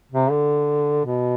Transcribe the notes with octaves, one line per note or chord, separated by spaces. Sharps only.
C3
D3
B2